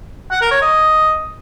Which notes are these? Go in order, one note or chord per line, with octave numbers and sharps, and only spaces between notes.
F#5
A#4
C#5
D#5